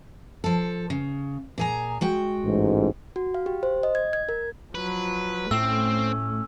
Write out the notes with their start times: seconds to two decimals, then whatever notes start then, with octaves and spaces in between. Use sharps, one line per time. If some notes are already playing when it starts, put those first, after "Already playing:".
0.44 F3 A4
0.90 C#3
1.58 A#2 G#4 A#5
2.01 G#3 F#4 G5
2.45 A1 G#2
3.16 F#4
3.34 F5
3.46 G4
3.63 C5
3.83 D#5
3.95 G#6
4.13 G#6
4.29 A#4
4.75 F3 F#3 B4
5.51 A2 A3 C4 C#4 E6